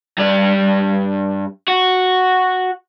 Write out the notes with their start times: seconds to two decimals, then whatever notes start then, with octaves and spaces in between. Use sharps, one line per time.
0.18 G2 D5
1.68 F#4